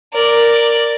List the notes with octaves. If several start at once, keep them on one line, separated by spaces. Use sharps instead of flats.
A#4 D5